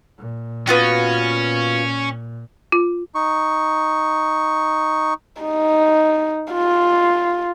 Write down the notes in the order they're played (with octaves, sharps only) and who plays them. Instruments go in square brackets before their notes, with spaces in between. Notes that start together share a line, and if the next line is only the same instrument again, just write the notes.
[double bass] A#2
[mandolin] B3 F4 F#4 [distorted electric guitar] C#4
[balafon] F4
[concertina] D#4 C#6
[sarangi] D#4
F4